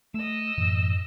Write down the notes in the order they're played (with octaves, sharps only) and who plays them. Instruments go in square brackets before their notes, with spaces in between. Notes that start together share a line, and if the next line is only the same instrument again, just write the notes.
[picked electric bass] A3 [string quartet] D#5 E6
[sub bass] F#2 [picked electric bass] A2 E3